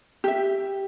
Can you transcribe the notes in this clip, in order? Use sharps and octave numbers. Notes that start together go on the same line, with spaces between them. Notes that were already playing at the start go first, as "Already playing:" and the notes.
G4 E5